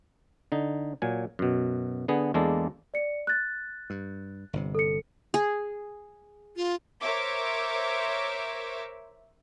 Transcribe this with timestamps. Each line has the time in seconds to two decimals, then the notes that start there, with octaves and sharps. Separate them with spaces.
0.52 D3 D#4
1.02 A#2 F#3 G#5
1.39 F#2 B2
2.08 D3 B3 G#4
2.34 E2 G#3 A#3 D4 A4
2.94 D5 C#7
3.27 F#6 A6
3.90 G2
4.53 G1 C3
4.75 A4 C#7
5.34 G#4
6.56 F4
7.01 A#4 C5 C#5 E5 D6